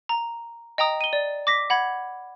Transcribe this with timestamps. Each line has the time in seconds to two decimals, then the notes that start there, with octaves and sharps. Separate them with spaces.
0.09 A#5
0.78 D#5 G5 A#5 D#6
1.01 D#7 G7
1.13 D5
1.47 D6 A#6 B6
1.70 F#5 B5 G#6